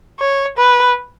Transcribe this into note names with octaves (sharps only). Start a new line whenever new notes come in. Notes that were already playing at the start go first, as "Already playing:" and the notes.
C#5
B4